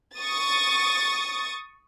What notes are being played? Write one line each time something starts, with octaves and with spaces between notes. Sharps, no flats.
C#6 D#6 A6